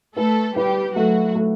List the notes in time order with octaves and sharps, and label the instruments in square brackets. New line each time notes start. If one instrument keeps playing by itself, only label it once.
[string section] A3 A4 [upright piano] B4
[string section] G3 G4 [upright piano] B4
[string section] F#3 F#4 [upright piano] A3
[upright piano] A3